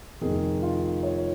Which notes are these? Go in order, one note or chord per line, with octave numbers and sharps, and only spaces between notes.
F1 F2 D#3 G#4
F4
C#5